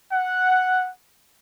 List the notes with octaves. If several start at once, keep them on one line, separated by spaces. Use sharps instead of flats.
F#5